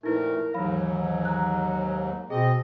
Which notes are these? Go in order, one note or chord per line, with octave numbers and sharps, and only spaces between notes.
F2 A#2 A3 D#4 E4 A#4 B4
D#2 G#2 E3 F#3 F5 B5
A#5 F#6
B2 C4 G#4 D#5